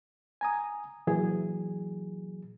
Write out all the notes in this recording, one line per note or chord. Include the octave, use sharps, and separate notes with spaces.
G#5 A#5 D#6
A#2 E3 F#3 G#4